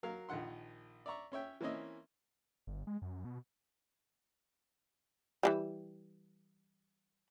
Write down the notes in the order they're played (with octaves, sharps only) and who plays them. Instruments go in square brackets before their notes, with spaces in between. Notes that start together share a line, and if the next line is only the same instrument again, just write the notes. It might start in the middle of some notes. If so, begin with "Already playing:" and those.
[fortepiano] F#3 A#4 F5
A#1 D#3 F3 F#5 C6
D5 E5 A#5 C#6
C#4 C#5 E5 G5
E3 A#3 C4 C#4 D#5 E5
[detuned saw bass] G1
G#3
F#2
B2
[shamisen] E3 F#3 G3